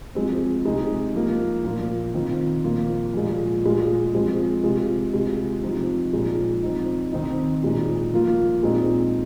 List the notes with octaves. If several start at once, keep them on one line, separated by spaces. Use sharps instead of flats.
F3 G#3 C4
C3 G#3 D#4
F3 A#3 F4
A#2 F3 A#3 F4
D#3 C4 F4
A#2 F3 A#3 F4
A#2 F3 G#3 F4
A#2 G#3 F4
F3 G#3 C4 F4
C3 G#3 F4
C3 G#3 F4
F3 C4 D#4
A#2 F3 G#3 D#4
F3 C4 D#4
D#3 C4 D#4
A#2 G#3 D#4
F3 A#3 F4
A#2 G#3 C4 D#4